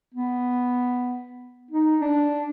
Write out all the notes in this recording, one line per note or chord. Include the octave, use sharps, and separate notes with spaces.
B3
D#4
D4